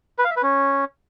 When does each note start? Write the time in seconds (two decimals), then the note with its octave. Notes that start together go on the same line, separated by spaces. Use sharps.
0.19 B4
0.25 F5
0.31 E5
0.37 B4
0.43 C#4